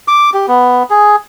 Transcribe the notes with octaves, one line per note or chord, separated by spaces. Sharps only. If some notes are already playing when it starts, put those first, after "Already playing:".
D6
G4
B3
G#4